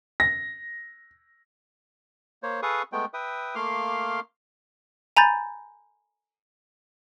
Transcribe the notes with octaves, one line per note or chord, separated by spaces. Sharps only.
A#6
A#3 C5 C#5
G#4 A4 B4 F5 C#6 D#6
G#3 A3 B3 G5
B4 E5 G5 D#6
A3 A#3 F5 C6 D6 F6
G#5 A#5 B5 G6 A6